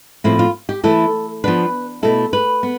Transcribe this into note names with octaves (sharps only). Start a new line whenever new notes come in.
A2 F3 C4 E4
F4
G4
E3 A3 E4 A4
F3 B3 D4 B4
B2 A3 E4 A4
B4
B3